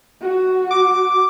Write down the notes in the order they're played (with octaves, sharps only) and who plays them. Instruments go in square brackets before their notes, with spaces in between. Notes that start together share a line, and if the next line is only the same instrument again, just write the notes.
[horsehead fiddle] F#4
[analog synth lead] D6